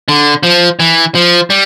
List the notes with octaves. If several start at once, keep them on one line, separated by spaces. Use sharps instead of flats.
D3
F3
E3
F3
G3